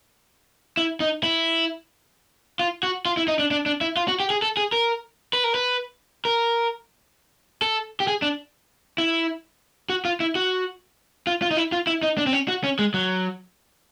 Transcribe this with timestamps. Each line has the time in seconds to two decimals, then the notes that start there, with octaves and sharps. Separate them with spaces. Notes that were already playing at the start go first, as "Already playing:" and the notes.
0.77 E4
1.00 D#4
1.23 E4
2.59 F4
2.83 F#4
3.06 F4
3.17 E4
3.28 D#4
3.39 D4
3.51 D4
3.66 D4
3.81 E4
3.97 F4
4.08 F#4
4.20 G4
4.30 G#4
4.42 A4
4.57 G#4
4.72 A#4
5.33 B4
5.44 A#4
5.55 B4
6.25 A#4
7.62 A4
8.00 G4
8.07 G#4
8.22 D4
8.98 E4
9.90 F#4
10.05 F4
10.20 E4
10.35 F#4
11.27 F4
11.42 F4
11.51 D#4
11.57 E4
11.72 F4
11.87 E4
12.03 D#4
12.17 D4
12.27 C4
12.33 C#4
12.48 F#4
12.64 C#4
12.79 G#3
12.94 F#3